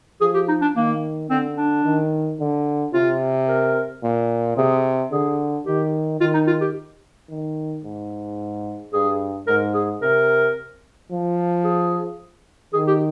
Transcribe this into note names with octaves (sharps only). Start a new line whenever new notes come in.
F3 G#4
G4
D#4
D4
D#3 A#3
D3 C4
D4
D#3
D3
C3 F4
A#4
A#2
C3 G#4
D3 G#4
D#3 G4
D#3 F4
D#4
F4
G4
D#3
G#2
G2 G#4
G#2 A#4
G#4
C3 A#4
F3
G#4
D#3 G#4
G4